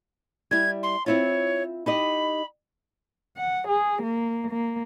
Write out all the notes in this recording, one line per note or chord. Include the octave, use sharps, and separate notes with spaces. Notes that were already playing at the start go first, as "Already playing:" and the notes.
G3 E4 G#6
C6
C4 E4 F4 C#5
D#4 G4 D#5 B5
F#5
G#4
A#3
A#3